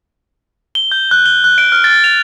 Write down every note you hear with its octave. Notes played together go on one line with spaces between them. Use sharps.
G7
G6
F#6
G7
F#6
D7
F6
A6
F7